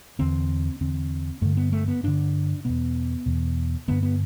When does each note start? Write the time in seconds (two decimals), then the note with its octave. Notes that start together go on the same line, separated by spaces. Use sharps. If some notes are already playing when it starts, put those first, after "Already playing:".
0.19 E2 D3 C4
0.81 E2 D3 C4
1.42 G2 D3 A3
1.57 B3
1.72 A3
1.88 B3
2.03 G2 D3 D4
2.65 E2 B2 B3
3.26 E2 B2
3.88 G2 D3 B3
4.03 B3